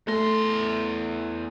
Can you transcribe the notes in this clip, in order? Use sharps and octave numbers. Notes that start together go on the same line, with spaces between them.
E2 A3 C6 A#6